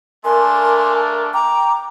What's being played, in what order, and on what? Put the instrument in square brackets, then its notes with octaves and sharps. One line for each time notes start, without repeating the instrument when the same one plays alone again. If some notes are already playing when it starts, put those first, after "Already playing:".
[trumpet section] A3 A#3 D4 [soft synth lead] A#4 [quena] G#5 [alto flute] C6
[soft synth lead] G5 [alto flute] A#5 [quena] D6